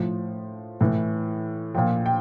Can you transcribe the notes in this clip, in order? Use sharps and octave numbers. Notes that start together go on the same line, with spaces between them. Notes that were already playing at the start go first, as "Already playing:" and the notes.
Already playing: A2 F3
A2 E3
A#2 F3 G5
G5